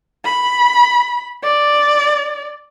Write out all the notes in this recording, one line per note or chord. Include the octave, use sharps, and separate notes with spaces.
B5
D5